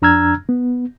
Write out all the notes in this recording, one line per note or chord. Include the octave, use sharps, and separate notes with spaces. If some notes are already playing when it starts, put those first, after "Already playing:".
F2 D4 A#5 E6 F6 G#6
B3